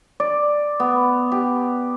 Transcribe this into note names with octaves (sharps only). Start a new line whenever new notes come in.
D5
B3
G4